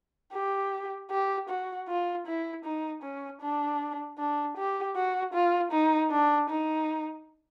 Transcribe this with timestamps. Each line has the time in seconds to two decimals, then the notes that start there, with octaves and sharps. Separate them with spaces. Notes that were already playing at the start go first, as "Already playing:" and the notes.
0.33 G4
1.11 G4
1.49 F#4
1.88 F4
2.26 E4
2.65 D#4
3.03 C#4
3.41 D4
4.18 D4
4.57 G4
4.96 F#4
5.33 F4
5.72 D#4
6.11 D4
6.49 D#4